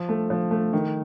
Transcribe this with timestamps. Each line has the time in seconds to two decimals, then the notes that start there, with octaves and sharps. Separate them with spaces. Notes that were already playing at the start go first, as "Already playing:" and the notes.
Already playing: F3
0.09 A3
0.30 F3
0.51 A3
0.73 D#3